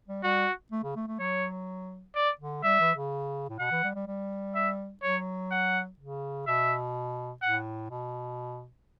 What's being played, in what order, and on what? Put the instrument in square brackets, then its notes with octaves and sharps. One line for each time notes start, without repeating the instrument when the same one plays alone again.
[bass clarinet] G3
[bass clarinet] G3 [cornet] F#4
[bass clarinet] A3
C#3
A3
A3
[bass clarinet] F#3 [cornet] C#5
[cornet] D5
[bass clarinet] D3
[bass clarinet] G3 [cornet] E5
[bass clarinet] E3
C#3
A2
[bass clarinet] B2 [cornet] F#5
[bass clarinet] E3
G3
G3
G3
[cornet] E5
[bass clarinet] F#3 [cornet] C#5
[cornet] F#5
[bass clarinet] C#3
[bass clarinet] B2 [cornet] E5
[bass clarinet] A2 [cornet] F#5
[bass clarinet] B2